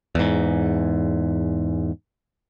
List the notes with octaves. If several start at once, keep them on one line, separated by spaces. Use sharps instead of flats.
E2 G#2